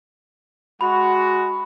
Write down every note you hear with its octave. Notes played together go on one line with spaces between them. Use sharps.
G#3 F#4 B5